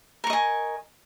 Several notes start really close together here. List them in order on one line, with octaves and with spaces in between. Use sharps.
A#4 C#6 D#5 G#5